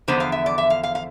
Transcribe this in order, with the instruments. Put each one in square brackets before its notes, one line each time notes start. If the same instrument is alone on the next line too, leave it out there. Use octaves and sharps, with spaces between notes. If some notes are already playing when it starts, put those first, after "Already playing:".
[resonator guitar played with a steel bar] E2 D3 F3 B3 C5
F5
E5
D5
E5
F5
F5
F5